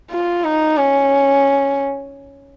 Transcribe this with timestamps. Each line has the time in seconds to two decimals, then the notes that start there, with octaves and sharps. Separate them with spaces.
0.11 F4
0.44 D#4
0.77 C#4